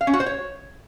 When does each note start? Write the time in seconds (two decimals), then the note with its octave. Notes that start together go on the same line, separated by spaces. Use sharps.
0.01 F5
0.07 C#4
0.14 F#4
0.20 C5
0.26 C#5